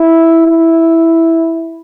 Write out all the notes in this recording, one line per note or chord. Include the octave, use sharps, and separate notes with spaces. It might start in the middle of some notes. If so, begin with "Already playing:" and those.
Already playing: E4
E4